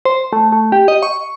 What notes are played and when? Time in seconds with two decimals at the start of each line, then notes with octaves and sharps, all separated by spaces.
0.05 C5
0.33 A3
0.52 A3
0.72 G4
0.88 D#5
1.03 C#6